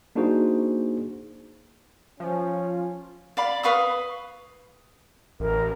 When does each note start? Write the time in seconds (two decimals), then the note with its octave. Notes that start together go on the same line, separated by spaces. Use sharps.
0.16 A#3 D4 D#4 F#4 G#4 C5
2.20 F3 C#4
3.37 D5 F5 B5
3.63 B4 F5 C#6 D#6
5.40 A1 A#4